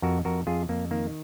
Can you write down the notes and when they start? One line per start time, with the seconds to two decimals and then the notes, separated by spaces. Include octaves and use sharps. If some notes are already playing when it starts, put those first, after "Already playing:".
0.02 F2 F#4 A#4
0.25 F2 F#4 A#4
0.47 F2 F4 G#4
0.69 F2 A#3
0.91 D#3 A#3